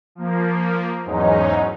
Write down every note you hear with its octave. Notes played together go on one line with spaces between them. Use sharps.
F3 A#3
E2 G#2 F#3 G#3 C#4 D#4